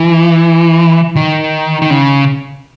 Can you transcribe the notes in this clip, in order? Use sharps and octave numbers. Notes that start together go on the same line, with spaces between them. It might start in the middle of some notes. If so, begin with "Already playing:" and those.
Already playing: E3
D#3
D#3
C#3